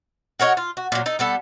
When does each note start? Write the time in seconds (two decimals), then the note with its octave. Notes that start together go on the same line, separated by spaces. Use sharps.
0.40 F#4 A#4 C#5 D#5
0.57 F4
0.77 F#4
0.92 A#2 F#3
1.06 D#4 A4
1.19 G3 B3 A4